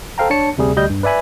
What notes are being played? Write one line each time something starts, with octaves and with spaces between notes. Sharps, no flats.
A4 C5 F5 G5 A#5
D4 C#5 A5 C#7
D2 C3 G3 G#4
D2 G3 D#5 G6
G2
B4 D5 E5 G#5 B5